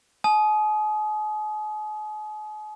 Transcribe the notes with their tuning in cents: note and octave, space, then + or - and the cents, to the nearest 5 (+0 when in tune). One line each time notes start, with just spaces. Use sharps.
G#5 +45 D#6 +0